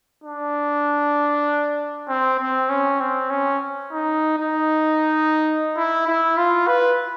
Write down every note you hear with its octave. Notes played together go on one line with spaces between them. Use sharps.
D4
C4
C4
C#4
C4
C#4
D#4
D#4
E4
E4
F4
B4